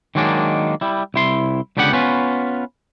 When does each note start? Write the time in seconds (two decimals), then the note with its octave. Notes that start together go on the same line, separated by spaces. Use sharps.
0.15 D#3 F#3 G#3 A#3 D4
0.81 G3 E4
1.14 C2 E4 C6
1.77 C#2 D3 B3 G4 G#4 F#5
1.93 B3 C#4 F4 B4